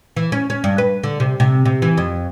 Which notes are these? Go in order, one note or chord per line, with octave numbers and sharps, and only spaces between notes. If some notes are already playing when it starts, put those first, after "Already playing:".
E3
C#4
C#4
G2
B4
D3
C3
C3
C3
E3
F2